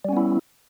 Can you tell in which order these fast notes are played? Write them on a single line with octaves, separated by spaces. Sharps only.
G3 C#4 B3 E4